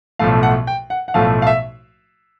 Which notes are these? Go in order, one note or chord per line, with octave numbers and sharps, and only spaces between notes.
B1 A2 F3 A3 F5
F#5
G5
F#5
F#5
B1 A2 F3 A3 F5
F5
E5